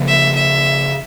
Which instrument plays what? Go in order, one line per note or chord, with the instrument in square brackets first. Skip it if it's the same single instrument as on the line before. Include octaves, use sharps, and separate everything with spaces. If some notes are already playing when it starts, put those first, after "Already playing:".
Already playing: [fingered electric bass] C#3 F3 A#3
[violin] E5
E5